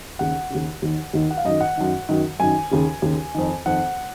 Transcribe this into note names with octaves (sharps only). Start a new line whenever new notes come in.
D#2 C#3 F#5
D#2 C#3
D#2 D#3
D#2 D#3
F#5
F5
F#2 D#3 D#5
F#5
F#2 D#3
F#2 D#3
F#2 D#3 G#5
D#2 C#3
D#2 C#3
F2 D#3
F2 D#3 F#5